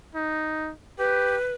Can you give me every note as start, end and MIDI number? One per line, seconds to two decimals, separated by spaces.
0.15 0.72 63
0.99 1.36 67
0.99 1.54 71